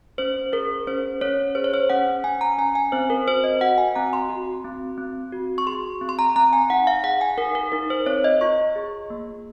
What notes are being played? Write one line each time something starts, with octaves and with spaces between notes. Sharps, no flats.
C#4 C5
G#4 A#4
C#4 C5
C#4 C#5
G#4 C5
C#5
C5
C#4 F#5
C#4 G#5
A#5
C#4 G#5
G#5
C4 C5
A#4
F#4 C5
D#5
F#4 F#5
G#5
C4 A#5
C6
F#4
C4
C4
F#4
C#6
G#4 C6
C4
C6
A#5
C4 A#5
G#5
D#4 F#5
F5
G#4 F#5
G#5
D#4 A#4
A#4
D#4 A#4
C5
C4 C#5
D#5
F4 C#6
G#4
A#3